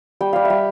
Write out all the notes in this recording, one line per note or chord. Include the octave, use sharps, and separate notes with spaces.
G3 G5
G3 F5
G3 E5